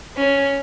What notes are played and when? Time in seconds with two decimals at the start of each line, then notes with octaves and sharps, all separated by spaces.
0.17 C#4